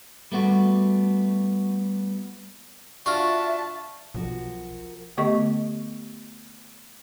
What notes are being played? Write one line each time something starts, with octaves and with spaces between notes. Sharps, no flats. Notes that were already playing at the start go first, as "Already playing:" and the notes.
G3 A3 B3 F#4
D4 F4 F#4 E5 A5 C#6 F6
B1 F3 F#4 A#4
D3 A3 B3 G4 D#5 C#6